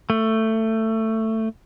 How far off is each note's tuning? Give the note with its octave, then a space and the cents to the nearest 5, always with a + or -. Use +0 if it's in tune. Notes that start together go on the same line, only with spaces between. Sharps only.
A3 +15